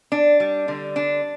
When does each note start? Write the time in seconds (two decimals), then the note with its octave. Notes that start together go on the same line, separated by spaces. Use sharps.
0.12 D4
0.40 G3
0.68 D3
0.96 D4